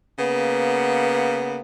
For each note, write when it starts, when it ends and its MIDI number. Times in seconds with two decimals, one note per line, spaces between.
0.19 1.59 49
0.19 1.59 58
0.19 1.59 59